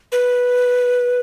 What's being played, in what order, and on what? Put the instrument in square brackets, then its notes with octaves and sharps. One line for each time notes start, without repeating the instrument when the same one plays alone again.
[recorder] B4